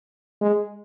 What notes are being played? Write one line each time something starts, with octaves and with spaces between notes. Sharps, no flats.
G#3